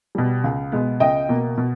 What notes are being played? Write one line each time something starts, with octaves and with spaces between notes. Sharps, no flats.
B2 G3
C#2
B2 G#3 B3
C#2 D#5 G5
B2 A#3
B2